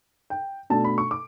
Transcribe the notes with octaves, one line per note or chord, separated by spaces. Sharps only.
G5
B2 A3 D4 A5
B5
C#6
D6